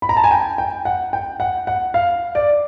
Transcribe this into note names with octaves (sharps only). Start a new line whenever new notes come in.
B5
A#5
A5
G#5
G5
G5
F#5
G5
F#5
F#5
F5
D5